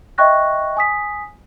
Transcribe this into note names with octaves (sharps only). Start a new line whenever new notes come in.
D#5 E5 G5 C#6 F#6 A#6
G#5 D#6 B6